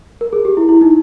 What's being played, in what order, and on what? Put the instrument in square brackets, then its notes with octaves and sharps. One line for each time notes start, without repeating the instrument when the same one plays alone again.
[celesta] A#4
G#4
G4
E4
E4
D#4